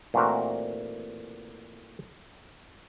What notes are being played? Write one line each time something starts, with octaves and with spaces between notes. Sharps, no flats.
A#2 E3 A3 C4 F#4 A#4